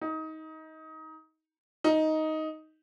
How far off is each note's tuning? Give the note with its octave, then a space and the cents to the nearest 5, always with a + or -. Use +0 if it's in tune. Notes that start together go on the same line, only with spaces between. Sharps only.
D#4 +20
D#4 +5